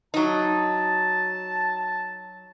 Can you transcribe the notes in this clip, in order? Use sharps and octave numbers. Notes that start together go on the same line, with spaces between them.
F#3 D#4 A5